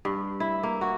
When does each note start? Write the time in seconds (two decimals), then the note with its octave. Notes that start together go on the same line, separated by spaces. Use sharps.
0.05 G2
0.40 E4
0.63 A#3
0.81 F#4